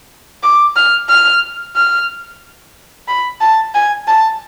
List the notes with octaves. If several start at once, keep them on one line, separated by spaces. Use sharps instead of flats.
D6
F6
F6
F6
B5
A5
G#5
A5